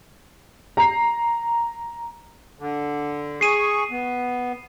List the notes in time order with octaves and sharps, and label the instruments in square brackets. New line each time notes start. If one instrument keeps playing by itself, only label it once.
[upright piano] A#5 C7
[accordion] D3
[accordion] G#4 C#6 [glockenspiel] C7 D#7
[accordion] B3